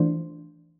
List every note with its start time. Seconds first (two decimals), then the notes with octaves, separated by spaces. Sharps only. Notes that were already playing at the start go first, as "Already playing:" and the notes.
Already playing: E3 A3 D4 F4 C5